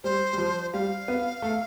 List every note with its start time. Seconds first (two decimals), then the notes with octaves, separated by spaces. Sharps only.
0.04 G3 C5
0.33 G3
0.38 F3
0.73 G3 F5
1.08 B3
1.42 A3